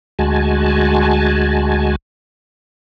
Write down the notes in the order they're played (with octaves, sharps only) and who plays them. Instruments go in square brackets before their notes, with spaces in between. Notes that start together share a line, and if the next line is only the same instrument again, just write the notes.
[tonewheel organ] D2 G#3 F#4 G#5 A5